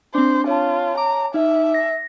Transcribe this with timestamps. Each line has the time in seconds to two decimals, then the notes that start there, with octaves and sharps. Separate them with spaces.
0.15 C4 D4 C5
0.48 F4 C#5 A5
0.97 A#5 D6
1.34 D#4 E5
1.74 A#6